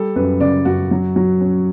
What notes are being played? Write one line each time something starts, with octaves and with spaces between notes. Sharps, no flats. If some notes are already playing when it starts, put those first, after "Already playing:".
Already playing: G3 A4
F#2 B4
C#3 D5
F#2 F#4
F#3
F#3
C#4